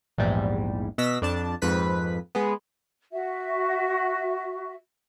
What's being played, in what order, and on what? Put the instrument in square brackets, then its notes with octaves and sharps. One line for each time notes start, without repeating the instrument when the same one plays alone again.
[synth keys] A#1 E2 G#2 G3
B2 E6 A#6 B6
F2 D4 A5
F2 G#2 B4 B6
G#3 B3
[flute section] F#4 E5